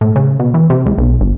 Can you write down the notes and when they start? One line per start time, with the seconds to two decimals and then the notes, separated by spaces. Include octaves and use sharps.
0.01 A2
0.16 C#3
0.39 B2
0.54 E3
0.70 C3
0.86 C#2
0.98 B1
1.20 G1